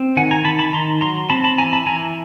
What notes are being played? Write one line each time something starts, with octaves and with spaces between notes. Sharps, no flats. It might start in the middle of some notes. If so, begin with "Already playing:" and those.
Already playing: C4
D#3 F#5 G#5
G#5 A#5
D#3 A5 B5
A5 B5
D#3 A#5 C6
F#3 A#5 C6
C4 A5 B5
A5 B5
E3 G#5 A#5
A5 B5
E3 G#5 A#5